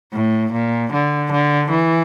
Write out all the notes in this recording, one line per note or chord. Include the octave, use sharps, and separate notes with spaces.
A2
A#2
D3
D3
E3